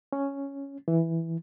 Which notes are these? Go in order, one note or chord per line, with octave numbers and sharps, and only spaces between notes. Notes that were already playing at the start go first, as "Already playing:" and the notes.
C#4
E3